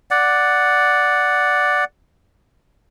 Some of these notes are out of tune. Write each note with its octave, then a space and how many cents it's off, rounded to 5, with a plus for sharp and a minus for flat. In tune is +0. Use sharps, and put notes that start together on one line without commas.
D5 +0 F#5 +0